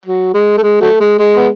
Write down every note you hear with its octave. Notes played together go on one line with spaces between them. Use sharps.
F#3
G#3
A3
G#3
F#3 A3
G#3
G#3
B3